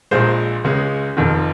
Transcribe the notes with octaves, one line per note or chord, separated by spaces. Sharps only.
A#1 A#2 G#3 C5
C#2 C#3 G#3
F1 F2 D#3